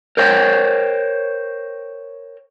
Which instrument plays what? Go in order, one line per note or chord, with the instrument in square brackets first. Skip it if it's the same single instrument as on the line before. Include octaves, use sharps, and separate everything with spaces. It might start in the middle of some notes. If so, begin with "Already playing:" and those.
[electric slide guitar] A#4 C5 C#5 G5